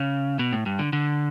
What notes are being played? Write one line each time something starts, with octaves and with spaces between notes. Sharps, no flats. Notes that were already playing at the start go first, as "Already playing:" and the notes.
Already playing: C#3
B2
A2
G2
D3
D3